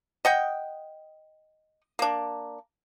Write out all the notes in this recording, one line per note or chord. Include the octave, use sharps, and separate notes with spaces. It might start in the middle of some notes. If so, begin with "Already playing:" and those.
D#5 F#5 G5
A#3 D4